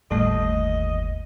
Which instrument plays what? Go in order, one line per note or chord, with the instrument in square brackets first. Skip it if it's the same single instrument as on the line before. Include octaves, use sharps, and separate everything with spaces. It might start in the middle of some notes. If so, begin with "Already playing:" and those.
[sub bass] G1 [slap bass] D#2 [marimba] A2 G3 A3 [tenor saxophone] D#5